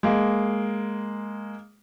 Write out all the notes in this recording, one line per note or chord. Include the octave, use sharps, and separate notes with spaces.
G#3 A#3